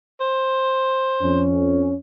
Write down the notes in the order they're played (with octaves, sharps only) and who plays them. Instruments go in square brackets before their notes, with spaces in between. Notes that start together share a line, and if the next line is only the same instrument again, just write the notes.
[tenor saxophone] C5
[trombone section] F2 C#4